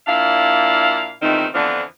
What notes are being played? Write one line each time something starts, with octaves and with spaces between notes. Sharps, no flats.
A#2 D4 E4 F5
E2 A#2 D#3 A3 C4 D#4
F2 D3 E3 F3 B3 D4